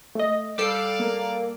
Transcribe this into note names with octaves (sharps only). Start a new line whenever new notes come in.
A3 D#5
G3 A4 D5 F5 D6 E6 C7 D7
A#3